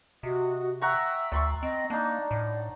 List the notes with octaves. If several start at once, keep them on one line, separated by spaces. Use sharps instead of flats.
C3 F#4 D#5 D#6
E5 F#5 G5 A#5 C#6 E6
D2 D5 C6 C#6
C4 D#5
A#3 D4 D#4 D5
A2